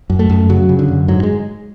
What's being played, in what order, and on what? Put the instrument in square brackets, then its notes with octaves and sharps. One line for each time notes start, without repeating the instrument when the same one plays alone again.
[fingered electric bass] F#2
A3
F#2
C#3 F#3
C#3
D3
F#2
G#2 F#3
G#3